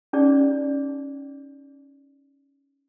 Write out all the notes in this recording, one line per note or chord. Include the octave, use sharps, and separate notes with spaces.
C#4 D#4 G#4 C#5 D5